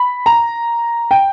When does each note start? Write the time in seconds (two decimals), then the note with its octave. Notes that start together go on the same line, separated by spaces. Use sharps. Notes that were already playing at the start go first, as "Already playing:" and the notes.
Already playing: B5
0.26 A#5
1.11 G5